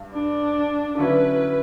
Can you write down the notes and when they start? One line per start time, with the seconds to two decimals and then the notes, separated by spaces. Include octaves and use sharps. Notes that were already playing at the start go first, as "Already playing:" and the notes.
Already playing: G2
0.13 D4
0.98 D3 F#3 C#4 E4 B4